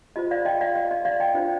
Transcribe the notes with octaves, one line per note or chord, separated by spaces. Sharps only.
F4 C5 D#5
D5 F5
D#5 G5
D5 F5
D#5
D#5
D5 F5
D#5 G5
D4 F4 C5